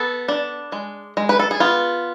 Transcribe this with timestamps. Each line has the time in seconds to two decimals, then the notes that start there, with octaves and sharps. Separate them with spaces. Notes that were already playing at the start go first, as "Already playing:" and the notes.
Already playing: B3 A4
0.28 D4
0.72 G#3
1.17 G#3
1.29 B4
1.39 A4
1.51 G#4
1.60 B3 F4